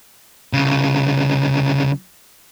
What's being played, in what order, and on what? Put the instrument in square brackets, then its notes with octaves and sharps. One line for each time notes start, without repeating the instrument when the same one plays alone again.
[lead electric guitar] C2 C#3